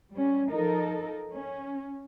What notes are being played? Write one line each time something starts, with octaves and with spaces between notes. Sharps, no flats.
G3 C#4
F3 D#4 A4 A#4
C#4